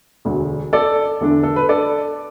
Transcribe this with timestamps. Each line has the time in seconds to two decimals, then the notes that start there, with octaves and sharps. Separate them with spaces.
0.25 E1 D2 D3
0.73 A4 D5
1.21 E2 D3 A3 D4
1.43 A4
1.56 B4
1.69 A4 D5